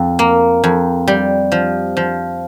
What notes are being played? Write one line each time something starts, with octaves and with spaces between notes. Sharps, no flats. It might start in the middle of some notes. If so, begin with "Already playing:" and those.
Already playing: F2
A#3
F2
G3
F3
F3